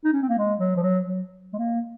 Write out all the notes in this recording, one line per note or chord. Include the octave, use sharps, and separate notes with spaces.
D#4
C#4
C4
A#3
G#3
F#3
F3
F#3
F#3
G#3
A#3